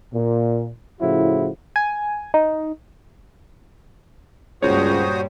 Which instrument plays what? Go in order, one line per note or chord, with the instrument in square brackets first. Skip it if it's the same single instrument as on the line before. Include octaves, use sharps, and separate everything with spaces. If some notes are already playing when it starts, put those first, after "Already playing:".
[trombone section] A#2
A2 C#3 F3 E4 F#4
[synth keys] G#5
D#4
[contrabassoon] C#2 [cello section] G2 A#2 G3 [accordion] F#4 C5 D#6 [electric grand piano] C#5